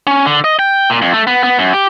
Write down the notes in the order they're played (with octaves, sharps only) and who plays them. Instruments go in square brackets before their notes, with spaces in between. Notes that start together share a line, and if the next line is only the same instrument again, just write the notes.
[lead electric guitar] C#4
D3
D#5
G5
A#2
F2
A3
B3
B3
F#2
G4